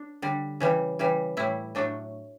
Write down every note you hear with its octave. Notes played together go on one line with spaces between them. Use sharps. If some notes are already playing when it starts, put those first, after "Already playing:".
Already playing: D4
D3 G3
C#3 E3 G3
C#3 E3 G3
A2 G3 E4
A2 F#3 A3 D4